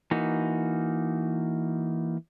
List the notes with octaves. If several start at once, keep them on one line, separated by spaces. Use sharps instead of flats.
E3 A#3 D#4 F#4